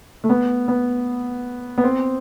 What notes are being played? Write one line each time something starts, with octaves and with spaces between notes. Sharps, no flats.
A3
B3
B3
B3
C4